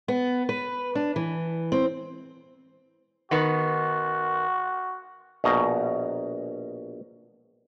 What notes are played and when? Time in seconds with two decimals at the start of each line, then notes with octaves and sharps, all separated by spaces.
0.08 B3
0.49 B4
0.95 D4
1.16 E3
1.72 C4
3.31 D#3 B3 F#4
5.44 A#1 B2 A#5